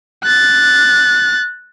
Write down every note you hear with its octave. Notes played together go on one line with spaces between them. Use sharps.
F#6 A6